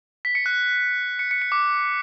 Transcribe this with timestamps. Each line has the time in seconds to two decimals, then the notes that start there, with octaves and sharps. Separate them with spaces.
0.25 B6
0.35 C#7
0.46 F#6
1.19 C#7
1.31 C#7
1.42 C#7
1.52 D6